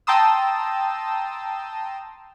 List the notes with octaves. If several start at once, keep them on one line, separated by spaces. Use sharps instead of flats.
G5 A5 A#5 C6 D#6 E6